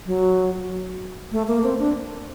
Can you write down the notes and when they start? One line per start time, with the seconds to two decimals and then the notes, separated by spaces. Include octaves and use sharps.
0.06 F#3
1.32 A3
1.48 A#3
1.63 C4
1.79 D4